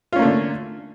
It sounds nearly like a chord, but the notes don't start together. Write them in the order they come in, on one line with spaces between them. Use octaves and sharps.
F4 C#4 A#3 A3 D3